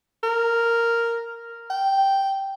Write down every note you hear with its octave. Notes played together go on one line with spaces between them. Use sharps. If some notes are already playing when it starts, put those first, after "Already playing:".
A#4
G5